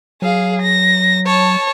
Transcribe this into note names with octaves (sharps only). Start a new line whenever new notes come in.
F#3 G#4 F5
A#6
C#5 A5